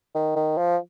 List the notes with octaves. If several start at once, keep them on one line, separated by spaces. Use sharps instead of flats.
D#3
D#3
F3